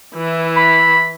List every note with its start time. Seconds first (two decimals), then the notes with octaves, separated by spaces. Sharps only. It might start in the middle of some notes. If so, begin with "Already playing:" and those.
0.15 E3 E4
0.57 B5